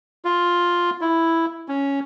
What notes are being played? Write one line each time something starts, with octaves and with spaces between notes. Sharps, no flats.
F4
E4
C#4